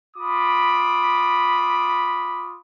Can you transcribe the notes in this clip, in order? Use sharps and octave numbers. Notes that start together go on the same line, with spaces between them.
F4 B5 D6 D#6